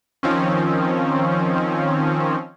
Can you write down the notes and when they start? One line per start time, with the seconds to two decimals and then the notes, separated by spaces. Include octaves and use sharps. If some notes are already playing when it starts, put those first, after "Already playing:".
0.23 D#3 F3 C4 C#4